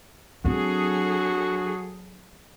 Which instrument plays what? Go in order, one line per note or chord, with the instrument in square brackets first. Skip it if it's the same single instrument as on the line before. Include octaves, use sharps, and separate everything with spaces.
[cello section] F#3 G#4 A4 [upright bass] C4 D4 [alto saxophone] F#4